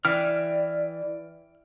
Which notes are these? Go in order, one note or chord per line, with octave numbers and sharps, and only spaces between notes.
E3 D5 G5 F6